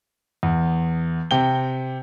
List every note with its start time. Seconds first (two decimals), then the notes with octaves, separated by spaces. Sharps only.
0.43 E2
1.31 C3 G5 G7